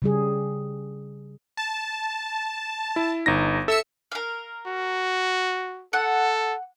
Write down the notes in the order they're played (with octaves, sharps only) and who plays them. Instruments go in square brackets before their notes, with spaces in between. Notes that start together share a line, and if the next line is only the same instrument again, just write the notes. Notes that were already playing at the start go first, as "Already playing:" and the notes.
[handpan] C#3 G3 G#4
[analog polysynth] A5
[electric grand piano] E4
G1 D#4 A#6
[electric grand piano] A4 [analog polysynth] E5 E6 C#7
[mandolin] A#4 F5
[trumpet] F#4
[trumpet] A4 [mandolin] F#5